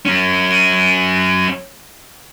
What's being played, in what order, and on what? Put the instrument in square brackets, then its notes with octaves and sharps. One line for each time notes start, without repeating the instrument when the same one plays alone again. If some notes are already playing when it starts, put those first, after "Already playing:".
[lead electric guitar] F#3 C#4